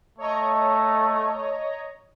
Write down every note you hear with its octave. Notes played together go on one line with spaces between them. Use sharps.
A3 C#5 D#5 A#5